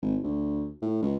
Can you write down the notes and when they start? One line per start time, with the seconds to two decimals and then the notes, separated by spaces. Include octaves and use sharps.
0.02 G#1
0.23 D2
0.82 A2
1.02 C#2